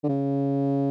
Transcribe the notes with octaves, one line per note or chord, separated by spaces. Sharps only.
D3
C#3